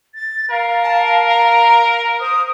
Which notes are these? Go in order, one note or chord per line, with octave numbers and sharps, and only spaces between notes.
A6
A#4 F5
A5
A#5
C5 D#6